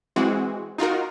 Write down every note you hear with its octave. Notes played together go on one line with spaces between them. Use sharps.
E3 G#3 C4 F#4
D#4 F4 F#4 A#4